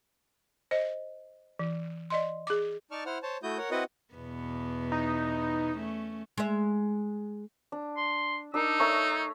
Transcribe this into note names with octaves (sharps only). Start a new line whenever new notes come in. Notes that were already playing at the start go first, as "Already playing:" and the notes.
C5 D#5
E3
D5 D#5 C6
G#4 D6
D#4 D5 A5 C#6 F6
E4 C5 F#5 F6
C5 C#5 A5
A3 E4 F#4 D#6 G6
A#4 C#5 F#5
C4 E4 F#4 B4 D#5 F#5
E2 B2 B3
D#4
A3 C#4
G#3 E5
D4
C6
D4 D#4 A#4 E6
A3 C#5 A#5